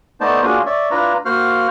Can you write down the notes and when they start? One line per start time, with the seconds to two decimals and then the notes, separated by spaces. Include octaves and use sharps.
0.21 A3 B3 D#4 C5 D5 A5
0.43 A#3 C#4 D4 F4 F#4 G#4
0.66 C#5 D5 E5
0.91 D4 E4 F4 B4 A#5
1.25 A#3 F#4 C5 F5 F#5 F6